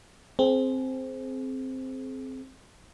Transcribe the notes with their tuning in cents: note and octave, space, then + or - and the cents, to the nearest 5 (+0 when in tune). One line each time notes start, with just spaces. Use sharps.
C4 +0 G#4 +35